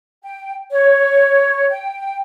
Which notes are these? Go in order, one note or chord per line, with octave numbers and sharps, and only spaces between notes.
G5
C#5
G5